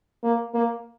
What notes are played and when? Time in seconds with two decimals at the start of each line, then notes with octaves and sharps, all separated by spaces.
0.23 A#3
0.54 A#3